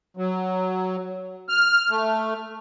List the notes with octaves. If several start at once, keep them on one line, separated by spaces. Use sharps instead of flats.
F#3
F6
A3